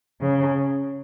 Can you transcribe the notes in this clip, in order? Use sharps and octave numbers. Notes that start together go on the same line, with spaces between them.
C#3